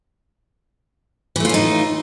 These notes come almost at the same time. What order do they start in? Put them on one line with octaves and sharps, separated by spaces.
E3 A3 F4 C#4 D#4